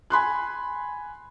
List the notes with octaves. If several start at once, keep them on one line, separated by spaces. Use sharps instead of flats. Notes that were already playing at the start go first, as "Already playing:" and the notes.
G#5 B5 C6 F#6